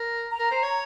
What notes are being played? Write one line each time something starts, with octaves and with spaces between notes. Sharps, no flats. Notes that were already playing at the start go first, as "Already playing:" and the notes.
Already playing: A#4
A#5
A#4
C5
C#5